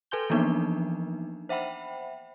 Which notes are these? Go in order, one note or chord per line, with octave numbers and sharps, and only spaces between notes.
A4 B4 G#5 C6 G6 G7
E3 F3 A#3 B3 D4 D#4
C5 E5 F#5 G5 B5